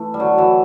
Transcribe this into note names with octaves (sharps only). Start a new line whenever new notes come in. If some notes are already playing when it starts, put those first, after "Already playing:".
Already playing: E3 A3
G3
D3 F#3
E3